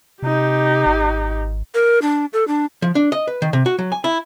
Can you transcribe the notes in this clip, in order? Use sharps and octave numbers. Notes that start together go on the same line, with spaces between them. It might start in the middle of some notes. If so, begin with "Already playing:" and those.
C3 D#4 G4
G#1
A#4
D4
A4
D4
F3
D4
D#5
B4
D#3
C3
F#4
F#3
G#5
E4